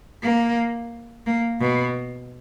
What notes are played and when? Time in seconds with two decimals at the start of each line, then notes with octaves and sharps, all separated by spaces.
0.23 A#3
1.26 A#3
1.61 B2